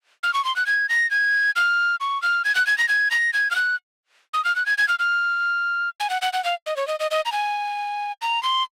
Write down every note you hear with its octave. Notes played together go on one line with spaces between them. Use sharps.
F6
C#6
C6
F#6
G#6
A#6
G#6
F6
C#6
F6
G#6
F#6
G#6
A#6
G#6
A#6
G#6
F6
F#6
D#6
F6
F#6
G#6
G#6
F6
F6
G#5
F#5
F#5
F#5
F5
D#5
C#5
D#5
D#5
D#5
A#5
G#5
A#5
C6